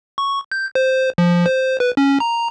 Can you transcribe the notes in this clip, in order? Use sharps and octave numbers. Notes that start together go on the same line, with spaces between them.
C#6
G6
C5
F3
C5
B4
C#4
A#5